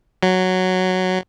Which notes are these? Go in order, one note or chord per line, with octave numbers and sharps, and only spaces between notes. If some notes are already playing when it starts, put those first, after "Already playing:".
F#3